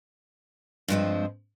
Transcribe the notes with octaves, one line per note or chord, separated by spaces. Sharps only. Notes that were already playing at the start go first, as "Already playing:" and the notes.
G2 F3 G#3 C4